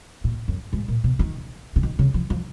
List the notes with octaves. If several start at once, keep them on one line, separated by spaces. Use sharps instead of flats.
A#2
F#2
G#2
A#2
B2
D#3
C#3
D#3
C#3
F3
F3